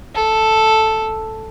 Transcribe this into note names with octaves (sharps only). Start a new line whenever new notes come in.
A4